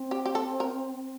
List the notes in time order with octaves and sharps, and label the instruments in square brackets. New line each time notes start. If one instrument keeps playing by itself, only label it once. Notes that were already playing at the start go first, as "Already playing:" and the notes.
Already playing: [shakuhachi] C4
[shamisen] G4
G4
A4
A#4